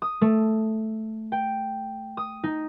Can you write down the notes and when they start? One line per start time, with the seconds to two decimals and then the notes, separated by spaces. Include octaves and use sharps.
0.02 D#6
0.21 A3
1.32 G5
2.17 D#6
2.44 D#4